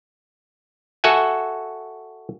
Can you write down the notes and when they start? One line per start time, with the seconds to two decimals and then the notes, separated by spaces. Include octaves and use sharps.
1.04 F#4 A4 E5 F#5 G#5